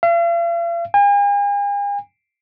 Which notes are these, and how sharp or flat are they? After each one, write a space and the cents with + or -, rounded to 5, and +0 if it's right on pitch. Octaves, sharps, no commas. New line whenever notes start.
F5 -45
G#5 -45